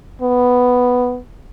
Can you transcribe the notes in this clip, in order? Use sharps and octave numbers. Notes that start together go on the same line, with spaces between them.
B3